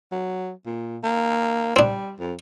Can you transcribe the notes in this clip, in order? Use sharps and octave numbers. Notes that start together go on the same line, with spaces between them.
F#3
A#2
A#3
G3 C4 D4
F2